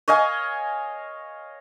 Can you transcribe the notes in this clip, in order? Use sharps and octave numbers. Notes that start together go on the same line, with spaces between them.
C#5 D#5 F5 G#5